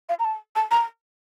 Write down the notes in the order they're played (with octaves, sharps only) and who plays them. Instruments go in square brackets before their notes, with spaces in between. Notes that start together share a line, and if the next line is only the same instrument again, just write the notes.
[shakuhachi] F5
A#5
A5
A5
A#5